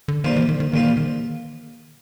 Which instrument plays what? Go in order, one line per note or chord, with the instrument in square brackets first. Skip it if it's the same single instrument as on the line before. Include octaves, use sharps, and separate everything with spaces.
[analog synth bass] D3
[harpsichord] A#1 A#2 G3 C4 F4 [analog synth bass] D#3
[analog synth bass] E3
D#3
D#3
[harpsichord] A#1 A#2 G3 C4 F4 [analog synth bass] D#3
[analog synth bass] E3
D#3